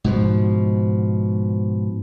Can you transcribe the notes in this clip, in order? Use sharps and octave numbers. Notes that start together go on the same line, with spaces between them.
G#2 B2 F3